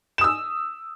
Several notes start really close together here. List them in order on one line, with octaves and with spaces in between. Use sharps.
E7 D#6 E6